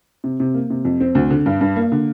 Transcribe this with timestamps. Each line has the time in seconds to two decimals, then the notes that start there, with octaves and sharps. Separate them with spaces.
0.24 C3
0.40 C3
0.54 A#3
0.70 C3
0.85 F2
1.00 C4
1.15 D2
1.30 D3
1.46 G2
1.61 G2
1.76 A#3
1.92 D3